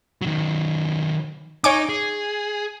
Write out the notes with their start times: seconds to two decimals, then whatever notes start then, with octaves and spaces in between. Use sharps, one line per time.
0.22 D#3 F#3
1.64 D#4 C#5 G#5 D6
1.89 G#4